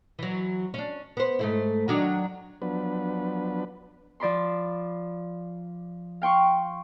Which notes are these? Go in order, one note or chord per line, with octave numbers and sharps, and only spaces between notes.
E3 F#3
C#4 D4
B3 C5
G#2 A3 E4
D#3 F#3 D4
F3 F#3 B3 D4 B4
F3 D5 B5 C6
F5 G5 C6 C#6